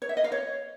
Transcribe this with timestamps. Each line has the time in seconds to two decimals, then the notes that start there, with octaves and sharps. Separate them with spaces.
0.02 C#5
0.09 E5
0.17 D#5
0.24 F5
0.32 C#5